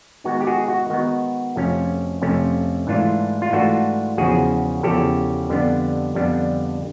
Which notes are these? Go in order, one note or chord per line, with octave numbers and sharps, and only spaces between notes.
D#3 G#3 B3 D#4 F#4
G4
F#4 G#4
F#4
D#3 G#3 B3 D#4 F#4
F2 C3 F3 A3 C#4
F2 C3 F3 A3 C#4
G#2 E3 A3 D4 F4
F4
G#2 E3 A3 D4 F4 F#4
E2 C#3 F3 F#4 G#4
E2 C#3 F3 G4 A4
F2 D3 G3 B3 D4
F2 D3 G3 B3 D4